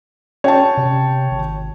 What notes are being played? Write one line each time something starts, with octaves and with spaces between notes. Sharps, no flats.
C#4 C#5 G5 A5
C3
G#1